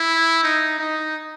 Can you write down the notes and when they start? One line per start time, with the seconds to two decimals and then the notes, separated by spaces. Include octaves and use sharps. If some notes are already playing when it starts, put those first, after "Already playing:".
Already playing: E4
0.43 D#4
0.79 D#4